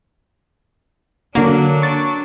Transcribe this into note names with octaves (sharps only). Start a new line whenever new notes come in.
D3 F#3 A#3 D4 F#4
C#6 A6